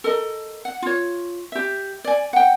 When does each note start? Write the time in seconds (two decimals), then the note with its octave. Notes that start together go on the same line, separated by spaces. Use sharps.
0.04 A4 A#4 D#5
0.65 F#5
0.82 F4 C#5
1.52 G4 E5
2.04 D5 G#5
2.33 F#5 G5